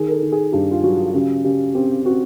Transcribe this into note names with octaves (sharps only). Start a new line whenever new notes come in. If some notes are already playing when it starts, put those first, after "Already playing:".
Already playing: D#3 G#4
A#4
A4
D#3
G#4
G2 G4
F4
F#3 F#4
C#3 G4
C#3 G4
C4 G4
C4 F#4